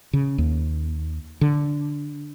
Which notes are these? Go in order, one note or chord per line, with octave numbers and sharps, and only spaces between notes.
C#3
D#2
D3